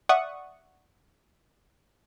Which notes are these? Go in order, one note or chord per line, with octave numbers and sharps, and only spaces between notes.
D5 E5 F#5 C#6 D#6